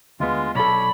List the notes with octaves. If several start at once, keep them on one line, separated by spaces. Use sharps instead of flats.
D2 G#3 B3 F4
B1 A4 C#5 D5 B5